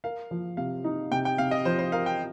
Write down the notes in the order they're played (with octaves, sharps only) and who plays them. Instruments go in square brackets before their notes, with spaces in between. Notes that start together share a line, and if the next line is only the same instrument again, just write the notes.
[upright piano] A#4 [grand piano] F5
[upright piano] F3
[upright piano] C3 [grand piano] F5
[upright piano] D#4
[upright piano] C3 [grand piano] G5
[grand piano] G5
[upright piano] C3 [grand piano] F5
[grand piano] D#5
[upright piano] F3 [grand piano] C5
[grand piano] C5
[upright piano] A#4 [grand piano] F5
[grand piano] G5